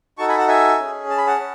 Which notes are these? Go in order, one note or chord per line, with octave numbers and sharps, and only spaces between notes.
D#4 F#4 A4 A5 C#6
G#5 B5
F#5 A5
E5 G#5
C#4 G#4
A5
B5
F#5 A5
C#4